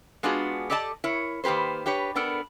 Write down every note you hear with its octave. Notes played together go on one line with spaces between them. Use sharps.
G#3 B3 D4 F4 F#4 G#4
G4 A4 D5 D#5 A5
E4 A#4 C#5
D#3 A#3 G4 B4 C5
D4 G4 B4 C#5
B3 D4 A4 A#4